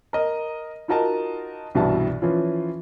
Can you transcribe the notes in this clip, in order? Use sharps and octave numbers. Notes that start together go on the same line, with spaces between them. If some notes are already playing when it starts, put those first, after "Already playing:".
A#4 D#5
D#4 F4 F#4 A#4 D#5 A5
C2 G2 B2 E3 E5 A5
E3 F3 C#4 F4